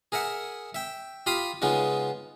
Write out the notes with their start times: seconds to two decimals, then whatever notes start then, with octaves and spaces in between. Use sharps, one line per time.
0.12 G#4 A#4 E5 F#5
0.74 E5 G5
1.26 F4 G4 F5 B5 C6 D#6
1.62 C#3 G#3 B3 D#4 F4